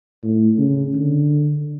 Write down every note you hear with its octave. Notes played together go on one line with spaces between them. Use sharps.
A2
C#3
D3